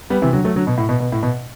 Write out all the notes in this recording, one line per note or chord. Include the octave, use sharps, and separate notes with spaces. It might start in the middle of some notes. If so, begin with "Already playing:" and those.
G3 B3
C3 E3
D3 F#3
F#3 A3
D3 F#3
B2
A2
B2
B2
A2
B2